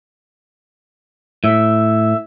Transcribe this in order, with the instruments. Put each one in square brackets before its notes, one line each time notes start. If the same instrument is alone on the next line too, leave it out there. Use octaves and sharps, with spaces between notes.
[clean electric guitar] A2 [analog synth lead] E5